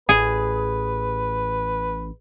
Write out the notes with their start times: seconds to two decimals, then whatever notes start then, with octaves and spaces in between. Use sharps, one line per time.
0.09 A1 G#4 B4